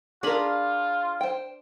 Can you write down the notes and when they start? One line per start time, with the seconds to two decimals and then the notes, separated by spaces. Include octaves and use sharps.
0.23 D4 F4 G#4 A#4 B5
1.21 C5 G5